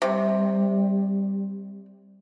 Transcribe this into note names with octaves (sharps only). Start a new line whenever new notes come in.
C3 G3